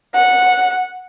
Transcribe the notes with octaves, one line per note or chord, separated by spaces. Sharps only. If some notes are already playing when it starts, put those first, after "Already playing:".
F#5